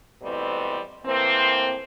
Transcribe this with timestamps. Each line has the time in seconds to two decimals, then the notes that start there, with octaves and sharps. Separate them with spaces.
0.22 G#2 B2 E3 G3 A3 C4
1.04 A2 E3 A#3 C4